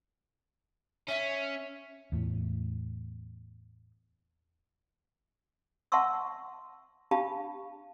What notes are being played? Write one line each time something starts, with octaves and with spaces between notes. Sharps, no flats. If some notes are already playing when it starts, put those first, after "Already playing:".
C#4 E5
E2 A2
E5 F#5 A5 C6 C#6 E6
D4 G4 F5 A5 B5